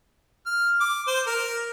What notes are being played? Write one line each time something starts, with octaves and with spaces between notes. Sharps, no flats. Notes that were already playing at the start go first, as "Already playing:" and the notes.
F6
D6
C5
A#4